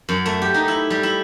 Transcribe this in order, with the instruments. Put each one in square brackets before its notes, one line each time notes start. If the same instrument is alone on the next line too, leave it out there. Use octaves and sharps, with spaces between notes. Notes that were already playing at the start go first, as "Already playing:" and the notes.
[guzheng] F#2
A3
G4
D#4
E4
G3
E4